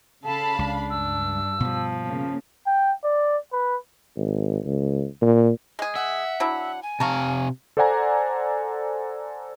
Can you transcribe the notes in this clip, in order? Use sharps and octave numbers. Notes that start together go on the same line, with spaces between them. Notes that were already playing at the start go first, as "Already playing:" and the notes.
C#3 A4 F5 A5 B5
C#2 D4
G2 E6
B2 F3 G3
C#3 A#3
G5
D5
B4
G#1
C#2
A#2
G#3 G#4
E5 F#5
F#3 D4 E4
G#5
C3 F5 A5 A#5 C#6
A4 C5 D5 F#5 G#5 A#5